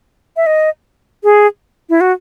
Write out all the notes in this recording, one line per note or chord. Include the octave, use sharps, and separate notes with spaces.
E5
D#5
G#4
E4
F#4